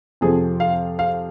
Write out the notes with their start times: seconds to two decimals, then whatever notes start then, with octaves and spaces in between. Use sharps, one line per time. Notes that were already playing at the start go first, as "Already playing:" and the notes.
0.21 F2 C3 F3 G#4
0.60 F5
0.99 F5